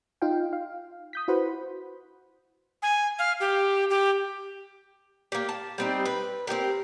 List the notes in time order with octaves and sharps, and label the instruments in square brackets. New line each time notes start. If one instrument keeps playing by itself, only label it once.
[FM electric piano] D#4 F4 F5 G5
F5
D#6 G6 B6
E4 F#4 B4 C5 F#5 B5
[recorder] G#5
F5
G4
G4
[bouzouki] A#3 G4
A5
G3 C4 D#4
B4
C4 D#4 G4 A#4